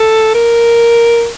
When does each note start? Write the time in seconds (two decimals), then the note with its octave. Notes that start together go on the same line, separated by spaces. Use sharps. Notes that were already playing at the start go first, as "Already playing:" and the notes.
Already playing: A4
0.34 A#4